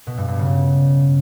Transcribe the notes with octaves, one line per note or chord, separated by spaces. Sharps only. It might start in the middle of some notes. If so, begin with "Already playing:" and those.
B2
G2
G2
C#3